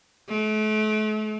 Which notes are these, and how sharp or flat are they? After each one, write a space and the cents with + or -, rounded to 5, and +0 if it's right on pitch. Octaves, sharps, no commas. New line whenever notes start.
A3 -40